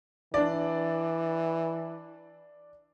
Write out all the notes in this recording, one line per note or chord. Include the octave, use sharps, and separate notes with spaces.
E3 D4 D5